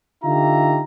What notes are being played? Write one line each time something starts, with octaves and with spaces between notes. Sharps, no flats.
D3 D#4 F4 G4 E5 A#5